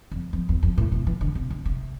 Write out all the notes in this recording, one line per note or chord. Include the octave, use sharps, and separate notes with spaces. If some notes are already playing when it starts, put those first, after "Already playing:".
F2
F2
E2
F2
A2
B2
E3
D3
C3
D3
C3